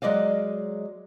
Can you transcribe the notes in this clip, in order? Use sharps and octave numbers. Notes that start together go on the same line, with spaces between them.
F#3 G#3 D5 D#5 F5